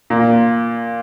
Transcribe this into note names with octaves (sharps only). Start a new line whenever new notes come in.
A#2